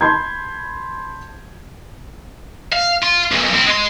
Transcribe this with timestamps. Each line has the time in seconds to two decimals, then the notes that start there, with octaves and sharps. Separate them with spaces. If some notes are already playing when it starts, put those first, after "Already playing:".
0.01 A5 B5 C6 G6 G#6
2.72 F5
3.03 F4
3.32 B1 A#2
3.54 C4 E4
3.67 G#3 C6